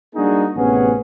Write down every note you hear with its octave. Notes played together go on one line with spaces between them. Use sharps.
G3 A#3 D4 D#4 F#4 G#4
A1 C3 B3 C#4 G#4 F#5